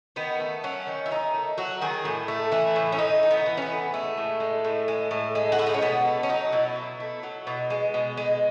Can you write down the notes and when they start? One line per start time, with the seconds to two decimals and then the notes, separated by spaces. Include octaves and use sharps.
0.16 D#3 B3
0.40 A3
0.64 F#3 C#4
0.87 D#3
1.06 E4
1.11 D#3 D#4
1.34 A3
1.58 F#3 F#4
1.82 D#3 G#4
2.05 A2
2.28 A3
2.52 E3 E4
2.76 A2
2.92 C#4
2.99 A2 D#4
3.23 A3
3.30 B3
3.46 E3
3.57 C#4
3.62 B3
3.70 A2
3.93 G#3 A3
4.17 A2
4.40 G#3
4.64 A2
4.88 G#3
5.11 A2
5.35 G#3
5.52 F#4
5.58 A2 E4
5.67 D#4
5.74 C#4
5.82 B2 B3
6.05 A3
6.23 C#4
6.29 F#3 D#4
6.52 B2 E4
6.76 B2
7.00 A3
7.23 F#3
7.47 B2
7.70 G#3
7.94 B2
8.17 G#3